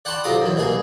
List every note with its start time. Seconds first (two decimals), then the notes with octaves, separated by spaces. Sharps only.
0.05 D5 F#5 G5 A5 B5 C6
0.23 B1 C3 F4 A#5 D6 D#6
0.41 F#2 E3
0.55 C2 B2 A#3 G#4